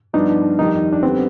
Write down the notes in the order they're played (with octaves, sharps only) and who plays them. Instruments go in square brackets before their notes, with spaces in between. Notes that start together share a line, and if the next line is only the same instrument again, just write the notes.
[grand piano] G2 F3 B3 D4 [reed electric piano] D#4
[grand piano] F2 D#3 G3 [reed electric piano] D#4
[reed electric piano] D4
[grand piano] D3 G3 B3 [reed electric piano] C4